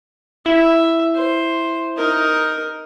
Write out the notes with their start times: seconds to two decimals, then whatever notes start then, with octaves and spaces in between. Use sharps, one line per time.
0.46 E4 E5
1.15 C5
1.97 D#4 A#4